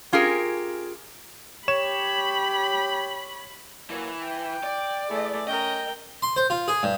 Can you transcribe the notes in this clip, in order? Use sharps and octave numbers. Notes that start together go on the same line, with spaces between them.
C#4 F4 G4 G#4 A#4
G4 C#5 B5 E7
E3 F#3 A#3
G5
D5
E3 A3 E4 G#4
C#4 A#4 D#5 G5
C6
C5
F4
G#4
G2